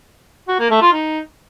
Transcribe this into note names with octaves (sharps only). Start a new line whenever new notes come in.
F#4
A#3
A3
F4
D#4